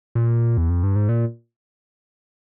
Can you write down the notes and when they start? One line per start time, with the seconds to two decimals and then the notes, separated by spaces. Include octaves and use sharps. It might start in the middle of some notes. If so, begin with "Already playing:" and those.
0.15 A#2
0.57 E2
0.70 F2
0.83 G2
0.96 G#2
1.09 A#2